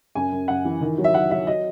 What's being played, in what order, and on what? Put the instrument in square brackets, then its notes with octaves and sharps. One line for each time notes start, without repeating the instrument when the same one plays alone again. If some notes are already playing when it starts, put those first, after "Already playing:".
[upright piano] F#2 G#5
F#2
F#2 F#5
E3
D#3
F#3
E5
F#3 F#5
F#3 E5
F#3 D#5